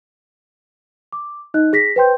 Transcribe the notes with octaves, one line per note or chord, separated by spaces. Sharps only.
D6
D#4 D#5 F#6
G#4 A#6 B6
B4 C5 G5 C6 G6